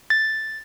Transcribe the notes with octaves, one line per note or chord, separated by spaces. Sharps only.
A6